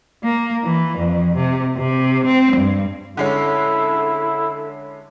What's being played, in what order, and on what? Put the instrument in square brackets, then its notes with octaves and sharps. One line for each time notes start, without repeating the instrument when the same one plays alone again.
[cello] A#3
E3
F2
C3
C3
C4
G2
[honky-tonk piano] D3 G#3 C#4 [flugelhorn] E4 [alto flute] A4